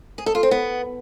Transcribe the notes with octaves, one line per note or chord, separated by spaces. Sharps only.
G#4
A4
F4
C4
B3